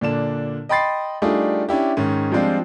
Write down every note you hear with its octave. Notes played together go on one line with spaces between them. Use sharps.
A#2 D3 D4 E7
D#5 G5 B5 C6 A6 C7
G3 A3 D4 D#4 F4 G#4
C#4 D4 E4 G4
G#2 D#3 C#4
F3 G3 G#3 C4 D4 F4